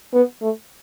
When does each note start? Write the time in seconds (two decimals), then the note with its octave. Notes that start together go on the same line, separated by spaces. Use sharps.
0.14 B3
0.42 A3